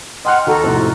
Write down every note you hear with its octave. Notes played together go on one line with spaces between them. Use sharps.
D#5 F#5 G5 C6 F6 F#6
D#2 F#4 A4 A#5
F2 A2 C3